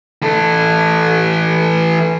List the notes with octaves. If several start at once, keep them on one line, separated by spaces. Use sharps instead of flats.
E3 A4